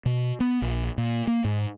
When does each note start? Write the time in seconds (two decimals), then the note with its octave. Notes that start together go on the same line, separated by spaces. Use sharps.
0.06 B2
0.40 B3
0.62 A#1
0.98 A#2
1.27 A#3
1.44 G#2